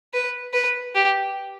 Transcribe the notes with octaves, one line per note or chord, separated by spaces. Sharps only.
B4
B4
G4